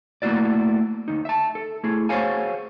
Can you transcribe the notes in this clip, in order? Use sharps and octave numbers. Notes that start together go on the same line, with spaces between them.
A3 A#3 E4 F#4 D5
D2 D#4
E5 A5
A4
A3 E4 G#4
F#4 G#4 C5 C#5 F5 G#5